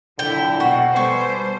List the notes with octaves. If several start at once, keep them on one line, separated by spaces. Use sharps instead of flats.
A#2 D3 F#3 E4 G5
B2 F#4
B2 G3 B3 A4 C5 G#5 C#6